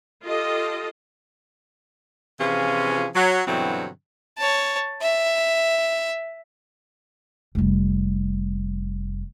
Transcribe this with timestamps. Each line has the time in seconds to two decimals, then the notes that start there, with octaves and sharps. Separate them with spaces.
0.24 F4 G4 A4 D#5
2.38 C3 E3 F3 C#4 F4 G#4
3.14 F#3
3.46 G2 B2 D3 E3 F#3 C4
4.38 C#5 A5
5.02 E5
7.55 F1 G3